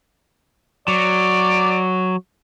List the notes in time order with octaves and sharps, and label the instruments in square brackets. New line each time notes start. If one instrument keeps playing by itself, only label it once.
[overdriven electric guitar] F#3 [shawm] D5